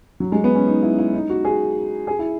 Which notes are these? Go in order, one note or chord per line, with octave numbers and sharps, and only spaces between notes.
F#3
G#3
B3
C#4
D#4
E4
E4
D#4
F#4
G#4
G#4
E4